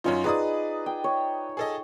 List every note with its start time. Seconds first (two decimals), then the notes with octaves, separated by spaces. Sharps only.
0.04 F#2 C#4 D#4 F4
0.24 D#4 G#4 B4 D5 F#5 D#6
0.86 G5
1.04 C#5
1.57 G#4 A4 D#5